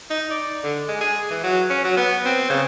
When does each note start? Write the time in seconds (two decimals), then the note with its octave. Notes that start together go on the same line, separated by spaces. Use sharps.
0.10 D#4
0.30 D5
0.64 D3
0.88 G#3
1.01 G#4
1.30 E3
1.43 F#3
1.70 C#4
1.84 F#3
1.97 B3
2.25 C4
2.50 C#3